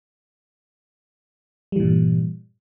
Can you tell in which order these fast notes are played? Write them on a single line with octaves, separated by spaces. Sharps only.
G3 E3 A#2 G2